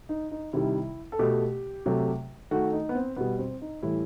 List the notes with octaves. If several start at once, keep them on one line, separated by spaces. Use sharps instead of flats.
D#4
D#4
C3 D#3 G3 E4
A4
B2 A3 G4
C3 F#3 A3
D#3 A3 F#4
D#4
B3
C4
B2 G3 B3
C4
D#4
A2 E3 G3 E4